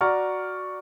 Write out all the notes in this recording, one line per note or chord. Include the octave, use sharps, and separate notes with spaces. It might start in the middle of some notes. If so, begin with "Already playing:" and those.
F#4 D5 F#5 A#5 C#6 F6